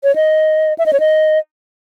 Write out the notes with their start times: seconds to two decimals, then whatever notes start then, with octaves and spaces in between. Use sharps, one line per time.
0.04 C#5
0.16 D#5
0.79 E5
0.86 D#5
0.93 C#5
1.00 D#5